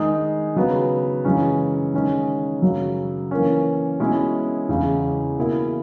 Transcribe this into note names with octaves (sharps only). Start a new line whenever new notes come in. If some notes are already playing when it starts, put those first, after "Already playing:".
Already playing: D#3 G#3 D#4 G#4
C#3 F#3 B3
F#2 C#3 E3 G#3 C#4
D#3 G#3 C#4
F#2 C#3 F#3
E3 A#3 C#4
B2 G#3 C#4 E4
E2 C#3 G#3 C#4
B2 A#3 E4 G#4